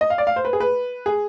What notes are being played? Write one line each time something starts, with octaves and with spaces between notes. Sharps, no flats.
D#5
F5
D5
F5
C5
B4
G#4
B4
G#4